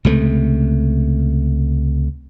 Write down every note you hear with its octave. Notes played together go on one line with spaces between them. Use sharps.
C#2 C3 A3